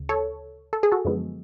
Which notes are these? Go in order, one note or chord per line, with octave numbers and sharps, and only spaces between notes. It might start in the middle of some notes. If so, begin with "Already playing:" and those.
Already playing: D2 C#3
A4 C#5
A4
G#4
F#4 A4
F#2 D3 F3 G#3 B3